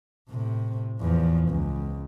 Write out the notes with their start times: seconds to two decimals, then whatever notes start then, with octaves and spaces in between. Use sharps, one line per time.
0.30 A2 C3
1.01 E2 F3
1.49 C#2